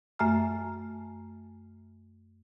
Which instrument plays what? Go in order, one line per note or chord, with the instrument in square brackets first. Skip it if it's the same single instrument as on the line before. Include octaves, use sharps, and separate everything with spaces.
[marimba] F#2 A3 E5 G#5 A#5 F6